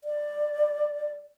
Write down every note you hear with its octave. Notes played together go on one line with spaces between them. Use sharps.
D5